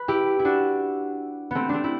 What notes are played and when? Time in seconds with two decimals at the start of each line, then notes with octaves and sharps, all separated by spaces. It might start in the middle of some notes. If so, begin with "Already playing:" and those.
Already playing: B4
0.08 E4 G4
0.39 E4
0.45 D4 F#4
1.51 A3 B3 C4
1.69 A3 C4 D4
1.84 E4